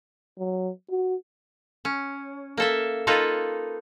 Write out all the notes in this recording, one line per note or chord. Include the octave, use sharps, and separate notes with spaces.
F#3
F#4
C#4
A#3 A4 E5
A#3 D#4 F4 A4 B4